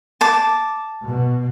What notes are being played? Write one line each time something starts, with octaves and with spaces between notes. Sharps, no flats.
A5 D6
B2